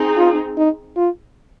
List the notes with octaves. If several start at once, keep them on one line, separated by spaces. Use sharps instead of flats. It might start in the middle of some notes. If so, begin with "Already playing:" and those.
Already playing: C4 D#4 G#4
F4
D#4
F4